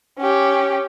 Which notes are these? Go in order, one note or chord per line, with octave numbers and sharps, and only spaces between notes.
C#4 G4